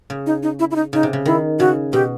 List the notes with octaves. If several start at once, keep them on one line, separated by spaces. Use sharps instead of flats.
C#3
D#4
D#4
E4
E4
D#4
C#3 D#4
C3
C#3
D#3 E4
C#3 F#4
B2 G4